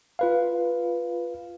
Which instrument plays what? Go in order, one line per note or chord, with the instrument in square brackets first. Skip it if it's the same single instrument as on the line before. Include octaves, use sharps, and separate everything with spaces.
[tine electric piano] F4 B4 F5